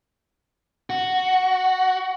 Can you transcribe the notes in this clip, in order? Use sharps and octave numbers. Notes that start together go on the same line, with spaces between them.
F#4